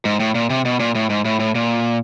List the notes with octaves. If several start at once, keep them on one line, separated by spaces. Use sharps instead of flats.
G#2
A2
A#2
C3
B2
A#2
A2
G#2
A2
A2
A#2